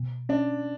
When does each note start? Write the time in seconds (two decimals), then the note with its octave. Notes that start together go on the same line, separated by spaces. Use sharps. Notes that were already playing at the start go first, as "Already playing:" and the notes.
Already playing: B2
0.29 C#4 D4